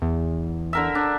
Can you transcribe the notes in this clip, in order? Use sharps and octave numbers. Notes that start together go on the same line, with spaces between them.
E2
D3 A#4 E5
D4